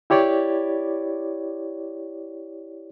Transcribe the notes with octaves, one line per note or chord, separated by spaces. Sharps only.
E4 G4 C#5 D5